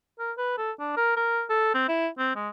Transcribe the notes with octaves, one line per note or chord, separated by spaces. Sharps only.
A#4
B4
A4
D4
A#4
A#4
A4
C4
E4
C4
G#3